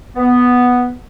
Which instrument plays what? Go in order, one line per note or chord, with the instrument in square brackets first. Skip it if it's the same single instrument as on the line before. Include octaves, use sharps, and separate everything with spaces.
[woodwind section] B3